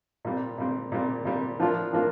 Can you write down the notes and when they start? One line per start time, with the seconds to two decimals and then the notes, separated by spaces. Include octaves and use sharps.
0.25 A#2 G3 C4
0.58 A#2 G3 C4
0.92 A#2 G3 C4
1.25 A#2 G3 C4
1.59 A2 F3 A#3 D4 F4
1.93 A2 F3 A#3 D4 F4